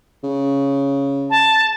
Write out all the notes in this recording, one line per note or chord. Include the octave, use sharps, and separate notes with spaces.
C#3
A5